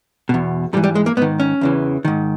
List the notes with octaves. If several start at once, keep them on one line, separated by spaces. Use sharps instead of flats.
E2 B2
G#2 E3 G3
G3
G#3
A#3
G#2 D#3 B3
C#4
E2 C#3 E3
G#2 D#3